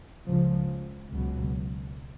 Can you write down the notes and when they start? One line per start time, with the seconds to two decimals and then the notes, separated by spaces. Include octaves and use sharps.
0.27 C#2 C#3 F3
1.11 C#2 B2 F#3